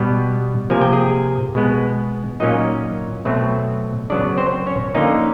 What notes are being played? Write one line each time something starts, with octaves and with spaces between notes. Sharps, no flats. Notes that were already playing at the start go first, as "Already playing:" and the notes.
Already playing: B2 G3 B3
C3 F3 A#3 G#5
G5
G#4 G#5
B2 G#3 B3
A#2 F#3 A#3 C#4 D#4 D#5
B2 F#3 A3 C4
C#3 F#3 B3 D4 D5
C4 C5
C#4 C#5
D3 F3 A#3 C#4 D#4 D#5